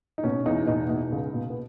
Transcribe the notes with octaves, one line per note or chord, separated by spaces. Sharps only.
D#4
B2 C#4
E2 D#4
B2 D#4
B2 D#4
C#2
B2
B3